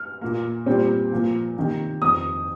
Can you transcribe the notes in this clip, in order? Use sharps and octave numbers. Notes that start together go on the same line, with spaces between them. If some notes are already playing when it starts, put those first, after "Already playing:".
Already playing: F6
A#2 A#3
A#2 G3 C4
A#2 F3 A#3
C3 D#3 A#3
F2 D#3 C4 D#6